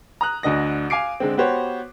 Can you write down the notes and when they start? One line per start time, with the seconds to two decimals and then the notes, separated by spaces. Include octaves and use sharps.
0.21 A#5 D#6 F#6
0.43 D2 D3 D#5 A#6
0.90 F5 G#5 D6 C7 D7
1.20 D3 G#3 C4
1.37 B3 F#4 G4 C5 C#5